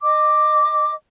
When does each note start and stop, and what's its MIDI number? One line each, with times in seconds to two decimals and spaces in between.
0.01 0.91 75
0.01 0.91 86